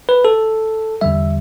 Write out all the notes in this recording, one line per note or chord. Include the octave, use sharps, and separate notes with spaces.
B4
A4
E2 D3 G3 E5